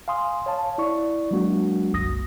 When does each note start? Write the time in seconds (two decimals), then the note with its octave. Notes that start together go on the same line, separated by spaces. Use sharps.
0.08 F5 G#5 C6 D#6
0.46 C#5 F5 A5
0.78 E4 D5 C#6
1.31 F#3 G#3 A#3 D4 F#4
1.93 G1 C2 F#2 D#6 A#6